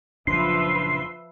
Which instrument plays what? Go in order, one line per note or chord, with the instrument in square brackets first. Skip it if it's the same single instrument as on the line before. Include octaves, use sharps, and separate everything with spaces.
[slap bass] F#1 A#2 D4 [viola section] F3 B4 E5 [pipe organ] C6 [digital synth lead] C7